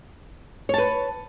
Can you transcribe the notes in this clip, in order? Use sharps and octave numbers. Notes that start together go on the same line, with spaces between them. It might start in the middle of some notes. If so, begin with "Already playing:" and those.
B4 C#5 A5